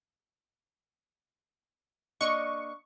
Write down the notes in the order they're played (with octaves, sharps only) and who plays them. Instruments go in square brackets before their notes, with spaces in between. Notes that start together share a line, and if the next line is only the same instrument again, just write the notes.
[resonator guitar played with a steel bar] A#3 D4 D#5 [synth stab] C#6